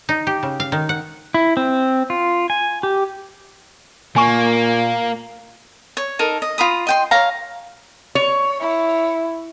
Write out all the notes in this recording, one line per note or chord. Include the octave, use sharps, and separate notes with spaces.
D#4
G4
C#3
F5
D#3
F#5
E4
C4
F4
G#5
G4
A#2 A#3 G#5 C#6
C#5
D#4 A4 A#4
D#5
F4 A#5 B5 D#6
D#5 G5 C6
C#5 F5 A#5
C#5
E4